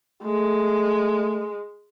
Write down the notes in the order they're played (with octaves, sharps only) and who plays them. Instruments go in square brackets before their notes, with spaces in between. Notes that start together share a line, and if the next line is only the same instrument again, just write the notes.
[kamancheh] G#3 [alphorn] A3